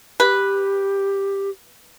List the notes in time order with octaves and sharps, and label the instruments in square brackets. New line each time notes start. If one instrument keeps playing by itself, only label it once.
[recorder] G4 [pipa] B4